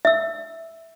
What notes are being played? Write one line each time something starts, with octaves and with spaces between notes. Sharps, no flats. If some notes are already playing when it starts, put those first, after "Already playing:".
E5 E6